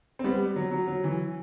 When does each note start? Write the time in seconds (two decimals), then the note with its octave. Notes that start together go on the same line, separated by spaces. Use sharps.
0.19 C4
0.24 G3 B3
0.56 F#3
0.71 F#3
0.88 F#3
1.04 E3